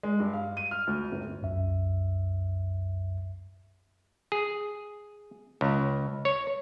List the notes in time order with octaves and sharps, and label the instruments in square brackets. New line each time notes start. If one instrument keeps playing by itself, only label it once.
[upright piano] G#3
G2
F5
D#7
F6
D2
G1
[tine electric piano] C2 F#2 E5
[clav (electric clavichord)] G#4
C#2
C#5